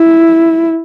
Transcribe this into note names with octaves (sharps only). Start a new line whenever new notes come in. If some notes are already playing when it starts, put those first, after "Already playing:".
Already playing: E4